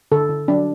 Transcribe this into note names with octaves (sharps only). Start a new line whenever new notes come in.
D3 A4
D3
F#3 D4